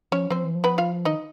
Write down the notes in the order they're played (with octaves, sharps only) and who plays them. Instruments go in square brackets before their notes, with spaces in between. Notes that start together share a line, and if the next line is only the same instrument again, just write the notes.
[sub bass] F3 [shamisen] C#4 C#5
[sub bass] F3 [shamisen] C4 C5
[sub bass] E3
F3
[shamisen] B3 B4
F4 F5
[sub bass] D#3 [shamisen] D#4 D#5